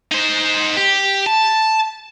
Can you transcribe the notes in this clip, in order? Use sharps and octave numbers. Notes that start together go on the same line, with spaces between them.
D#4 C5
G4
A5